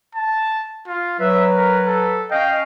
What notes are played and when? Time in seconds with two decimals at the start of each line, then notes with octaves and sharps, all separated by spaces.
0.15 A5
0.87 F4
1.20 F#3 B4 E5
1.55 A#4
1.86 A4
2.31 C#4 D#5 F5 G5